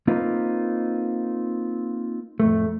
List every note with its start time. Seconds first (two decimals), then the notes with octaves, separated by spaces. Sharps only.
0.07 A#3 C4 D#4 F4 B4
2.40 F2 A2 A3